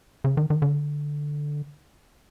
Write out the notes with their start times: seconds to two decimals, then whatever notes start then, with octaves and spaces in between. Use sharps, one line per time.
0.24 C#3
0.37 D#3
0.50 D#3
0.62 D3